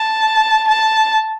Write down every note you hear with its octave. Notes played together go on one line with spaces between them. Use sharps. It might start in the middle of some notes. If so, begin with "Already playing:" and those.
Already playing: A5
A5